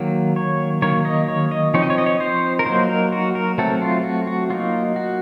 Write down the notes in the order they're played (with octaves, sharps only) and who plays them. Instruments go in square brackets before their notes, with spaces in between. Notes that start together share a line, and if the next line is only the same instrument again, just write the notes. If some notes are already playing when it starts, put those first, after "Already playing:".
Already playing: [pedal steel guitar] D#3 F#3 A#3
C#5
D#3 F#3 A#3 C#5
D#5
C#5
D#5
F3 C4 D#4 C#5
D#5
C#5
D#5
C#5
C5
A#4
F#3 A#3 D#4 C5
A#4
F#4
A#4
F#3 A3 C4 A4
F4
F#4
F#4
F#3 A#3 D#4 F4
F#4